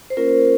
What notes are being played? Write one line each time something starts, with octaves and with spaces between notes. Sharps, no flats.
C5
A#3 C#4 F4 A#4